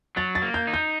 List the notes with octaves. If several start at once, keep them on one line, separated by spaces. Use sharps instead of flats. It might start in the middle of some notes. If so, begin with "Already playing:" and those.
F#3 A6
A6
A#3
G6
D#4
G6